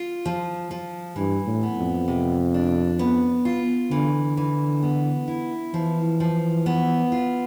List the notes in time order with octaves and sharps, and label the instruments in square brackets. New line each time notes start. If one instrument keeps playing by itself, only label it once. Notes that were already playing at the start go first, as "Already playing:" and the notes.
Already playing: [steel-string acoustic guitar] F4
F3
F3
[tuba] G2 [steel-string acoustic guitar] E3
[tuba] A2
[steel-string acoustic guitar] B3
[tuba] F2
[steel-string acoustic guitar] C3
D4
B3
F4
[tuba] D3 [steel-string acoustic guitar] E3
[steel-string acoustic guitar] E3
B3
E4
[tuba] E3 [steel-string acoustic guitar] F3
[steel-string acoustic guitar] F3
B3
F4